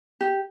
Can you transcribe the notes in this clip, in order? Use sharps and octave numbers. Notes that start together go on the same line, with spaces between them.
G4